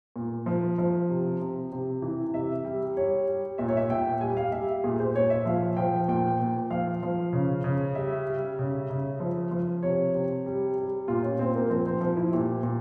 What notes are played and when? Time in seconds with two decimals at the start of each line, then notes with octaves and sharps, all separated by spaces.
0.16 A#2
0.46 F3
0.78 F3
1.09 C3
1.41 C3
1.72 C3
2.02 E3
2.34 C3 E5
2.65 G3
2.97 G3 C#5
3.28 G3
3.58 A#2 E5
3.68 C#5
3.77 E5
3.90 A#2 G5
4.21 G3 G#5
4.37 F5
4.52 G3 E5
4.84 A#2 G#4
4.99 C5
5.15 A#2 C#5
5.30 E5
5.45 F3 F5
5.77 F3 G5
6.08 A#2 G5
6.40 A#2
6.70 F3 F5
7.03 F3
7.33 C#3
7.64 C#3
7.95 G3 E5
8.27 G3
8.59 C#3
8.90 C#3
9.20 F3
9.51 F3
9.83 C3 C#5
10.14 C3
10.46 G3
10.77 G3
11.08 A#2 F4
11.23 C#4
11.39 A#2 C4
11.55 A#3
11.70 F3 C4
11.86 C4
12.01 F3
12.17 E4
12.33 A#2 G4
12.63 A#2